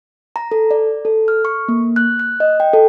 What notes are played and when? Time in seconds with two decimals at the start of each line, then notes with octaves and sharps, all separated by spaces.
0.36 A#5
0.52 A4
0.71 D5
1.05 A4
1.28 F6
1.45 C#6
1.68 A#3
1.96 F#6
2.19 F#6
2.40 D#5
2.60 G5
2.73 A4